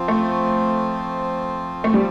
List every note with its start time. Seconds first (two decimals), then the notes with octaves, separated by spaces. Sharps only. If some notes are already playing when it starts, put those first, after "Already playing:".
Already playing: F3 C4 F4
0.08 A3
1.84 A3
1.94 G3